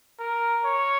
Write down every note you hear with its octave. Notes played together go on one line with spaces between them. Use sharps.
A#4
C#5